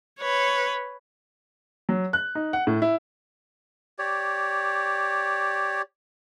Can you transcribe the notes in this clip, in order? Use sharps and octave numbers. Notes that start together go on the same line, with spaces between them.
B4 C#5
F#3
F#6
D#4
F#5
A2
E4
G4 C#5 D5